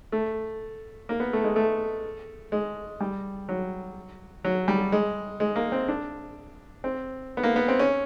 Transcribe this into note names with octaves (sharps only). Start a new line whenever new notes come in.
A3
A#3
B3
A3
G#3
A3
G#3
G3
F#3
F#3
G3
G#3
G#3
A#3
C4
D4
C4
B3
A#3
B3
C4
C#4